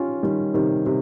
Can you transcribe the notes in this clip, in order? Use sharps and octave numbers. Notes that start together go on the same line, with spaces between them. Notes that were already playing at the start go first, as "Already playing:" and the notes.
Already playing: C#4 D#4 F4 G4
D#3 G3
C3 D#3
C3